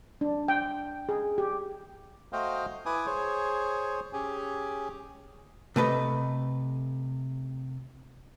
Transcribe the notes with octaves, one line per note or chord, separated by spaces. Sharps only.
D4
G5
G#4
G4
A3 F#4 C5 D#5 F5 G5
E4 B4 G#5 D6 D#6
G#4 C5 C#5
C#4 G4 G#4
C3 A3 B4 D#5